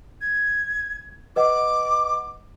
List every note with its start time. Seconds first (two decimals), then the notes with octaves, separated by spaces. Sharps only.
0.21 G#6
1.36 B4 D#5 F#5 D6